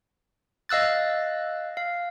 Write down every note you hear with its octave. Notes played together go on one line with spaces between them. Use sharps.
D#5 F5 E6 F#6 A6
F5